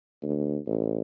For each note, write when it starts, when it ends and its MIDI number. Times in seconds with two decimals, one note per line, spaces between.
0.23 0.58 38
0.66 1.01 33